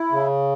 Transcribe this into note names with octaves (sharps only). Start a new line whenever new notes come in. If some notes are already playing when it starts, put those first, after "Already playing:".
Already playing: E4
C#3